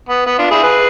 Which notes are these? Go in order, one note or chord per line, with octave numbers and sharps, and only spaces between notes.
B3
B3
D4 F4
E4 G#4
G#4 B4